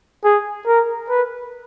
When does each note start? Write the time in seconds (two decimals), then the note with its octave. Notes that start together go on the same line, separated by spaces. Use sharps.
0.24 G#4
0.67 A#4
1.09 B4